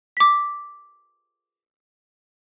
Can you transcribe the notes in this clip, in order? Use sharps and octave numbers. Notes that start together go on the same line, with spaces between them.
D6 B6